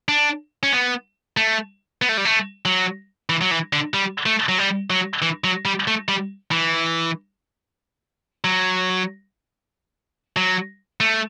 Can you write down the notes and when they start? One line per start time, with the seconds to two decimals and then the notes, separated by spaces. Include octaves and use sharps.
0.09 D4
0.63 C#4
0.73 B3
1.37 A3
2.02 B3
2.09 A3
2.17 G3
2.25 A3
2.65 F#3
3.30 E3
3.41 F#3
3.51 E3
3.73 D3
3.94 G3
4.26 A3
4.49 F#3
4.58 G3
4.90 F#3
5.22 E3
5.44 F#3
5.65 G3
5.87 A3
6.08 G3
6.51 E3
8.44 F#3
10.37 F#3
11.00 A3